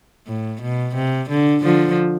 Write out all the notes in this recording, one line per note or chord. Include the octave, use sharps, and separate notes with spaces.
A2
B2
C3
D3
D3 F3